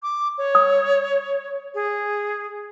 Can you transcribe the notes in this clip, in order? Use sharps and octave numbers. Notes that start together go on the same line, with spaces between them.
D6
C#5
D#6
G#4